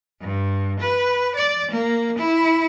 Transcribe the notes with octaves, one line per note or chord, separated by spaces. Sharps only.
G2
B4
D5
A#3
E4